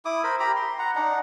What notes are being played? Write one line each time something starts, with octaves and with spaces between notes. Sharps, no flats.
E4 D6 D#6
A#4 C5 B5
G4 A#5 B5
C6
F#5 A#5
D4 D#4 F#5